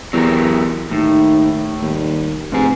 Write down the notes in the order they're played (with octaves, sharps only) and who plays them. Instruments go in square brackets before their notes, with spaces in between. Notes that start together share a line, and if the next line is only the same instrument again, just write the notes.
[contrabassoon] E2 [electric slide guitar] F#3 G4 A#4
[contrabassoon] D#2 [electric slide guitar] A2 [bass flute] D#4
[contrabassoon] D#2 [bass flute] G3
[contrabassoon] F1 [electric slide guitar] G#2 G#4 [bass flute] B4